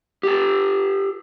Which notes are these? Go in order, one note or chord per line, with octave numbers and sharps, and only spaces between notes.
G4 A4